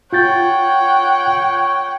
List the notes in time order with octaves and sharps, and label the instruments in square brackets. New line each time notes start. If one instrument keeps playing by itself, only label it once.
[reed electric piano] F4 G6 A6 [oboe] C#5 [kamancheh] F#5 G5